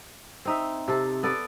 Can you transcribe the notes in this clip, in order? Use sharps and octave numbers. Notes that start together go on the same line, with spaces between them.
C4 D#4 E5
C3 A4
B3 A4 D5